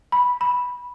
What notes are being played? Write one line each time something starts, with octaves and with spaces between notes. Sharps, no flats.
B5
B5